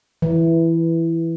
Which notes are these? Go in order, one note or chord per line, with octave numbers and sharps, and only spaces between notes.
E3